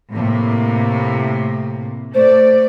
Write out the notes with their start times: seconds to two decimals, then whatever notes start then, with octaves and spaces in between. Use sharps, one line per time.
0.13 A2 C3 A#3
2.14 A3 C5 D5